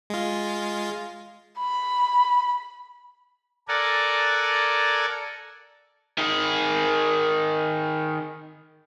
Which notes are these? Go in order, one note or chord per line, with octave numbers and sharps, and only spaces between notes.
G#3 F4
B5
A4 A#4 D5 F#5 G#5
D#3 G#4